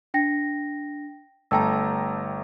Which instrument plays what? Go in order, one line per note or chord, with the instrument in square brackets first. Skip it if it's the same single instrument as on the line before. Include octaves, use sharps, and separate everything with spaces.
[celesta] D4 G5 A#6
[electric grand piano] G1 A3 A#5 [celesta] G5 A5 E6